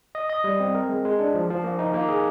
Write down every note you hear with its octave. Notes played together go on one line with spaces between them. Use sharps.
D#5
D#5
G3
C4
A#4
G#3
G#3
D4
F3
F3
A#3
D#4
A#3
G#4